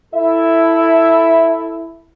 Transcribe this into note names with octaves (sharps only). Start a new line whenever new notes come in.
E4 A4 E5